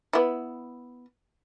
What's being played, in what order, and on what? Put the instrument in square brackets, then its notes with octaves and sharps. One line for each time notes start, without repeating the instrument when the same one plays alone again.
[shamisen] B3 E4